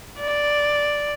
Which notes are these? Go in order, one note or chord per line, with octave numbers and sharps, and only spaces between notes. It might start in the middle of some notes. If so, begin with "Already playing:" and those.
D5